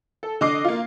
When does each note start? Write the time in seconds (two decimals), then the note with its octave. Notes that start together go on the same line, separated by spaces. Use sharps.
0.23 A4
0.41 D3 D#5 D6 C7
0.65 A#3 F4